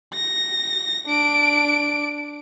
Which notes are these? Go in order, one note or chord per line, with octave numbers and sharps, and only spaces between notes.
A#6
D4 D7